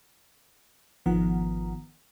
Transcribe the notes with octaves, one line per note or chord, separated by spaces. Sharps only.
G#1 D#3 F3 B3 F#5 A#5